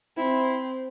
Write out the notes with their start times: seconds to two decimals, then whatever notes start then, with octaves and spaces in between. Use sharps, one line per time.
0.17 C4 E4